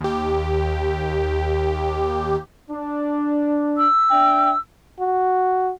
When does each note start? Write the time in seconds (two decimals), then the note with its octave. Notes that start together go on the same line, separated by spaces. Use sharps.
0.01 D#2 G4
2.70 D4
3.77 E6
4.10 D4 E5 G5
5.00 F#4